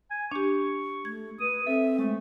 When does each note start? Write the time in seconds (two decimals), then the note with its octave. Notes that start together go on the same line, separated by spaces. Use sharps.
0.11 G#5
0.32 D4 G4 C#6
1.05 A3 G#6
1.40 B4 D#6
1.67 C4 A4 E5
1.99 G#3 A3